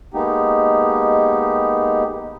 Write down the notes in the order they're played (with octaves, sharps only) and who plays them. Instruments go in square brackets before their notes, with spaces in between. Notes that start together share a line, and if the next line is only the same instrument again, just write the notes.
[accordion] G#3 A#3 B3 D#4 G4